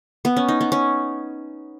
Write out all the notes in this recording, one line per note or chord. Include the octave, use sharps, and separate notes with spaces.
B3
C#4
D#4
B3
C#4